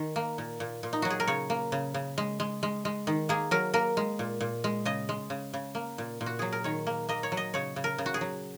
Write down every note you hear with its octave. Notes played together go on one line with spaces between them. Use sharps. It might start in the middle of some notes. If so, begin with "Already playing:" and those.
Already playing: D#3
A#3
A#2
A#2
A#2
D#4
F#3 F#4
G#4
A#4
C#3 C#5
A#3
C#3
C#3
G#3
G#3
G#3
G#3
D#3
A#3 G#4
F#3 A#4
A#3 A#4
G#3
A#2
A#2
G#3
C#3 D#5
G#3
C#3
C#3
A#3
A#2
A#2
F#4
F#3 G#4
A#4
D#3 C#5
A#3
A#3 D#5
C#5
F#3
D#5
C#3 C#5
C#3
A#4
C#3
F#4
G#4
F#3